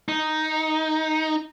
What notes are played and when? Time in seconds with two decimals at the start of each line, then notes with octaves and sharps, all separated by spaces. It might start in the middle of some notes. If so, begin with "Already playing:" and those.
0.09 D#4